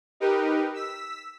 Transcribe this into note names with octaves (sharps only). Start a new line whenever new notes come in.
D#4 G4 A#4 B4
E6 B6